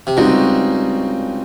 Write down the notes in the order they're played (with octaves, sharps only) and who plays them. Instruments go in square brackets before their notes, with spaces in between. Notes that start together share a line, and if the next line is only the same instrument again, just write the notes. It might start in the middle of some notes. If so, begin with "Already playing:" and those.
[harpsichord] C3
[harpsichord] C#2 C#3 [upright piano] G3 C4 D#4 F#4